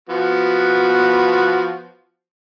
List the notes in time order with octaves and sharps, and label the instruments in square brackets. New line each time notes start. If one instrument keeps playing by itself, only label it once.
[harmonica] F3 B3 F#4